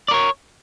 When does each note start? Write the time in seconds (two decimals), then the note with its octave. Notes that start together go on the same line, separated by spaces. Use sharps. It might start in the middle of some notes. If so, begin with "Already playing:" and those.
0.08 D5
0.11 A#4
0.14 C#5